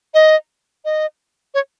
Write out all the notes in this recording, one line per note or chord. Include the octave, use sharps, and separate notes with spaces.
D#5
D#5
C#5